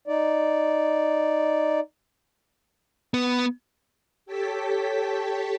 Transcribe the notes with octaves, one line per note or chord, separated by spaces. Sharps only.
D#4 D5
B3
G4 A4 C#5 G5 A5 B6